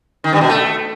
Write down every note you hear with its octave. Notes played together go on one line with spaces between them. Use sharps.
D#3
G2
B2
A3